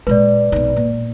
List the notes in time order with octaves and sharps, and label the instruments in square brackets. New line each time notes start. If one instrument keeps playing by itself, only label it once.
[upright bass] A#2 G#3 [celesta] B4 D5
[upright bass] B1 D#4
A#2